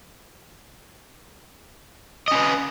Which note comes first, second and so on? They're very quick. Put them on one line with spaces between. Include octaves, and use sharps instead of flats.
D#5 C#4 B4